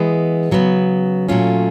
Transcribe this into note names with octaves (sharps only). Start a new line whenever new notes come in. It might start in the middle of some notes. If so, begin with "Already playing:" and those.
Already playing: E3 G#3 B3
C#3 F#3 B3
A#2 F#3 A3 C#4 F4